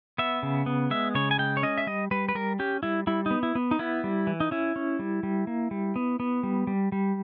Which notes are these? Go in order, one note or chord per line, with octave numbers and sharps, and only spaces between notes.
B3 E5
C#3
B3
G#3 E5
C#3 C#5
G#5
G#3 G5
C#5
C#4 D#5
E5
G3 D#5
G3 B4
B4
G3 A#4
C#4 G4
G3 E4
G3 E4
B3 D#4
E4
B3
D#4
B3 E4
G3
E3
D#4
C#4 E4
C#4
G3
G3
A#3
G3
B3
B3
G3
G3
G3